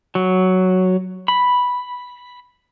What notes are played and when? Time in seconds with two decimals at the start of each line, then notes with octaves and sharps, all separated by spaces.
0.15 F#3
1.28 B5